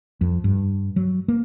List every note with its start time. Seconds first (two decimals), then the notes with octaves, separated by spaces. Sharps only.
0.21 F2
0.44 G2
0.96 F#3
1.28 A#3